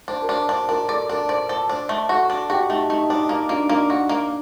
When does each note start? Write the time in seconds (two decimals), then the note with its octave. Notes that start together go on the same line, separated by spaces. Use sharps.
0.08 D4 C5
0.22 A#4
0.28 D4 C5
0.49 D4 C5
0.69 D4 A#4
0.88 A4 D5
1.09 D4 A#4
1.29 C5 D5
1.49 A4 C5
1.69 D4 C5
1.89 A3
2.09 F#4 A4
2.30 D4
2.50 F#4 G4
2.69 A3 D#4
2.90 A3 D#4
3.09 D4 D#4
3.29 A#3 D#4
3.49 A#3 D4
3.60 D#4
3.69 A#3 D4
3.90 F#4
4.09 A#3